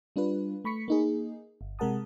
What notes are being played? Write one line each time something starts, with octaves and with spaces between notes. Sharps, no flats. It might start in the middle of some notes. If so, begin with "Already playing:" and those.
G3 D4 F4 B4
A3 B5 C#6 B6 C#7
A#3 D#4 G#4
G1
C3 G#3 A#4 F#5 A5 D#6